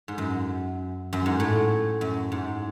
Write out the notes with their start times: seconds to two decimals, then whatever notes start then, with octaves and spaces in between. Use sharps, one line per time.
0.08 G#2
0.18 F#2
1.13 F#2
1.26 G#2
1.40 A2
2.01 F#2
2.32 G#2